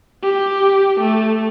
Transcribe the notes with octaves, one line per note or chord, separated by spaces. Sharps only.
G4
A3